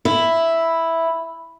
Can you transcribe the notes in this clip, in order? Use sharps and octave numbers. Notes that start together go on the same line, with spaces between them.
E4